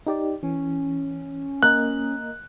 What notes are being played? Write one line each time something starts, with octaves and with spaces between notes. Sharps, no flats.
D#4 G4 D5
E3 C#4
A#3 A#4 D#5 F#6